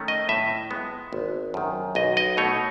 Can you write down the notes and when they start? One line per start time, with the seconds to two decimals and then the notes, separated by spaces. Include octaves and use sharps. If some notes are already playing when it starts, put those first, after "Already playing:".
Already playing: D#3 A3 C#4
0.08 D#5
0.29 A2 E5
0.71 G#3 B3
1.13 G#1
1.54 F#2 D#3
1.95 B1 D#5
2.17 D#5
2.37 B2 A3 D#4 C#5